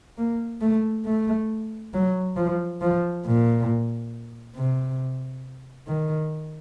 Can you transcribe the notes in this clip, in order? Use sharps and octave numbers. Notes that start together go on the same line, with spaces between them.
A#3
A3
A3
F#3
F3
F3
A#2
C3
D#3